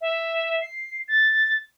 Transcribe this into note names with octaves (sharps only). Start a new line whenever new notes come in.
E5
C7
A6